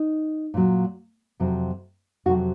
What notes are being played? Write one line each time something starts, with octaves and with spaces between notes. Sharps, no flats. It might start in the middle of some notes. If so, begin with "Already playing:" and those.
Already playing: D#4
A#2 F#3
F2 C3 F#3
F2 C3 F#3 F#4